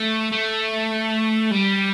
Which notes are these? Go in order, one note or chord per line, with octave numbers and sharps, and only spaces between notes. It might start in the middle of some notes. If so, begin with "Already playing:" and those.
Already playing: A3
A3
G3